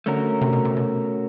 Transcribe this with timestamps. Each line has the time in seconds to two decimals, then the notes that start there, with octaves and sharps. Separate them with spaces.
0.06 D3 A3 C#4 F#4 A#4
0.41 C3
0.53 B2
0.65 C3
0.77 B2